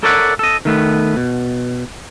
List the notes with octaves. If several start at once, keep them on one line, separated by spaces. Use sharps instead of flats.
A4 A#4 C#5 D5 E5 F#5
A4 D#5
D#3 A3 B3
B2